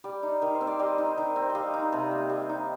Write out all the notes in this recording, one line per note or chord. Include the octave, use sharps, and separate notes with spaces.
G3 D5
D#4
D#3 A#4
C5
C4
D5
G3 D#5
D#4
D#3
C4
D#5
G3 F5
D#4
C3 A5
A#3
G3
D#4